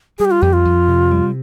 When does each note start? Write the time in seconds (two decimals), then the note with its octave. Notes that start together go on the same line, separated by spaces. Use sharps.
0.19 G3 G#4
0.25 G4
0.31 F4
0.42 F2 G4
0.53 F4
0.65 F2
0.88 C3
1.11 G3